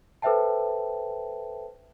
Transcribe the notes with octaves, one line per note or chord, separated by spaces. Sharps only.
A4 B4 C5 E5 G5 A5